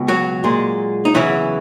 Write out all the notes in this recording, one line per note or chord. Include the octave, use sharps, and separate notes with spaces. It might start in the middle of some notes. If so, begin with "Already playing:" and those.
Already playing: C#2 B2
F#3 F#4
A#2 G#3
D#4
E2 C#3 E3 F#3 E4